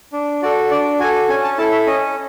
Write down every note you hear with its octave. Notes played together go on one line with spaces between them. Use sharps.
D4
F#4 A4 D5
D4 D5
F#4 A4 G#5
C#4 G#5
A5
E4 A4 A5
E5
C#4 D#5